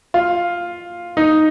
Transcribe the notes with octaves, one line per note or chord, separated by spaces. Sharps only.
F4
D#4